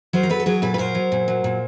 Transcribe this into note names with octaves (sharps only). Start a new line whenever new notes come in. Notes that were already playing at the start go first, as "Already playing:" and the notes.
F#3 A#4 C5
A#4
F#3 A4 B4
A4
F#3 G#4 A#4
A#2 A4 B4
B4
F#3 A#4 C5
F#3
A#2
F#3
A#2